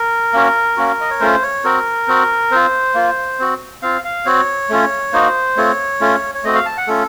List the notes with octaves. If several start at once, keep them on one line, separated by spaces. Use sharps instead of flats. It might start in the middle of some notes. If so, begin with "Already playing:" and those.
Already playing: A#4
A#3 C#4 F#4
A#3 C#4 F#4
D#5
C#5
A3 C#4 F4 C5
C#5
C4 F#4 A#4
C4 F#4
C4 F4 C5
A#3 F4
C4 F#4
C4 F4 F5
F5
C4 F#4 C#5
A3 C#4 F4
A#3 D#4 F#4 C5
A3 C4 F4 C#5
A3 C#4 F4
C#5
A3 C4 F#4 D#5
F5
A5
F#5
A3 C#4 F4 A4